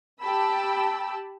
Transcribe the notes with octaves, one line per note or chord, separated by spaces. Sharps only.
G4 G5 A5 B5 E6